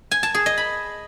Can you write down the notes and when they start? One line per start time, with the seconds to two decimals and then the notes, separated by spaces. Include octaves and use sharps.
0.11 G#5
0.23 A5
0.34 G#4
0.46 D#5
0.58 B5